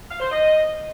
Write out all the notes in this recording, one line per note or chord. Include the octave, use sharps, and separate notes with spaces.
F5
C5
D#5